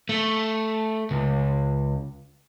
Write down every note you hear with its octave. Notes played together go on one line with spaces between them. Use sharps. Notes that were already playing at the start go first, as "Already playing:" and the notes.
A3
C#2